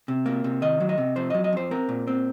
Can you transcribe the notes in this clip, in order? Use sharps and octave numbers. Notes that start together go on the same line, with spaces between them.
C3
A#3
C3
D#3 D#5
F#3
D#5
C3
F2 C5
F#3 D#5
D#5
F2 C5
C4 A#4
A#2
C4